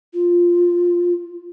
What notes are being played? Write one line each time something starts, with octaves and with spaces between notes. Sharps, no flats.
F4